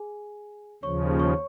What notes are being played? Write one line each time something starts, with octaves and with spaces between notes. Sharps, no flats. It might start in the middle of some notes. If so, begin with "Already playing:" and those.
Already playing: G#4 G#5
D#2 C#3 F3 C#5 C#6
C#5 C#6